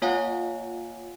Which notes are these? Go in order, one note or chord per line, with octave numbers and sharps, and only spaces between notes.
A#3 F4 C#5 F5 F#5 G#5